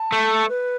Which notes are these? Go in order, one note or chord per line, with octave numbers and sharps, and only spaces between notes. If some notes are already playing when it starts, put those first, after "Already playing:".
Already playing: A5
A3
B4